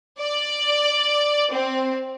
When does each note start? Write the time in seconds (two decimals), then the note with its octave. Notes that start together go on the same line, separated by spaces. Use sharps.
0.20 D5
1.52 C4